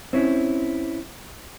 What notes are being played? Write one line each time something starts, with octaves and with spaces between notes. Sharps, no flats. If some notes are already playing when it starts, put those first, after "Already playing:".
C4 C#4 E4